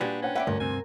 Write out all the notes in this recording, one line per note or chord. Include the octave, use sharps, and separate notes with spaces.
A#2 G3 D4 F#4 G#4 B4
C#4 C5 F#5 G5
B4 C5 D5 E5 F#5 G5
D2 G2 A#4
G2 C3 C4 G#5